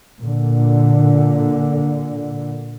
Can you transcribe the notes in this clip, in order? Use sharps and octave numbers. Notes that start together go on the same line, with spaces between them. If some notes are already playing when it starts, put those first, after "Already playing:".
A#2 D3